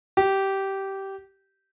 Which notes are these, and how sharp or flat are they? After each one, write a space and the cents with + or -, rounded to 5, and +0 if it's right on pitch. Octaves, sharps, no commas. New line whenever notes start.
G4 -15